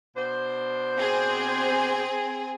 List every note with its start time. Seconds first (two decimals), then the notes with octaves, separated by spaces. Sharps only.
0.16 B2 D4 C5
0.96 C4 G#4